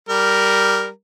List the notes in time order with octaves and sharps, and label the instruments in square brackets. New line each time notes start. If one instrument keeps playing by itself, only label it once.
[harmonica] G3 A#4